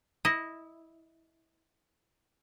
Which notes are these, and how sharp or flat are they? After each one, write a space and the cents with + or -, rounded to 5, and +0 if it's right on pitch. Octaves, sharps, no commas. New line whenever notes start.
E4 -15 D#5 +0